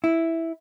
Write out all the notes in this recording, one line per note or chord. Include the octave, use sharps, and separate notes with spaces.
E4